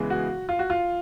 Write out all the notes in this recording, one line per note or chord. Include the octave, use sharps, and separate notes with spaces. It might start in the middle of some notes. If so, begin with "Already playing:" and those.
Already playing: C#3 E3 G#3 B3
F#4
F4
F#4
F4